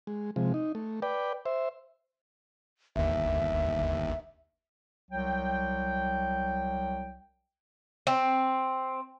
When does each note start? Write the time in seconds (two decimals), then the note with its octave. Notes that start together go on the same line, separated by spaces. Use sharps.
0.07 G#3
0.36 C3 F3 G#3
0.54 D#4
0.75 A3
1.02 B4 D5 G5
1.46 C5 E5
2.96 G1 D#2 E5
5.11 C2 F#3 G5
8.07 C4